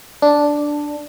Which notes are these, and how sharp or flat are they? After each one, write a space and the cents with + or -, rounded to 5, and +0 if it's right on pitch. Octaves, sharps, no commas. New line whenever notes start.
D4 +0